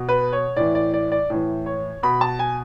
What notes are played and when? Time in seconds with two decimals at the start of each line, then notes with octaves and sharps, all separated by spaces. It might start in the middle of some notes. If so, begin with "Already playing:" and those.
Already playing: B2
0.09 B4
0.33 C#5
0.56 A2 E3 D5
0.75 D5
0.94 D5
1.12 D5
1.30 A2 E3
1.66 C#5
2.03 B2 B5
2.21 A5
2.39 G#5